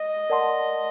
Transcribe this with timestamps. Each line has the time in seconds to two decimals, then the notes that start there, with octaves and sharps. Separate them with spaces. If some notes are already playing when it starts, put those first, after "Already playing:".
Already playing: D#5
0.30 A#4 D5 F#5 A5 C6